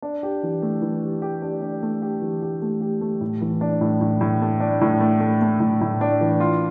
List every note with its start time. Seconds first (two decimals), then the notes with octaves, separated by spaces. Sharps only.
0.02 D4
0.23 G4
0.43 E3
0.62 A3
0.82 E3
1.03 G4
1.22 G4
1.42 D4
1.61 D4
1.83 A3
2.02 G4
2.22 E3
2.42 G4
2.62 A3
2.81 G4
3.01 A3
3.21 A2
3.41 E3
3.61 D4
3.81 A2
4.01 A2
4.21 A2
4.42 A3
4.60 D4
4.81 A2
5.01 A3
5.20 A3
5.41 A3
5.60 A2
5.81 A2
6.01 D4
6.21 E3
6.40 F4